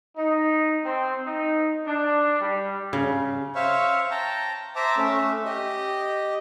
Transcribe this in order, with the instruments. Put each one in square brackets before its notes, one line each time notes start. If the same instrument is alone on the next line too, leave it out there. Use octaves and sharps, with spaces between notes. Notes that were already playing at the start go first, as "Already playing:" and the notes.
[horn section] D#4
C4
D#4
D4
G3
[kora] C#3
[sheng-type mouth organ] C5 C#5 E5 F5 C#6
G5 A5 A#5
C5 E5 A5 A#5 D6
A3 C#4 E5
G4 D#5